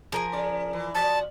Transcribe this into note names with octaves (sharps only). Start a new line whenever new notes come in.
F3 G#4 A#4 G#5
C#3 D5
E3
F3 F#4 D5 A5